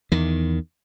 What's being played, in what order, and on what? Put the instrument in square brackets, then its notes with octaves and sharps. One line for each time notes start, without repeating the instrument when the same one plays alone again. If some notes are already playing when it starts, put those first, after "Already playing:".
[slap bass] E2 D#3